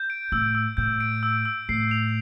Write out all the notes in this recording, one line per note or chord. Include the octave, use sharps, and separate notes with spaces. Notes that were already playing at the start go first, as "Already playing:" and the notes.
Already playing: G6
D7
A2 E6
E6
A2 G6
D7
E6
E6
A2 C7
F7